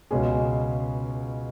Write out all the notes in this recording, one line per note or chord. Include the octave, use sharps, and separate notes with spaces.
C#2 B2 G#3 C#4 G#4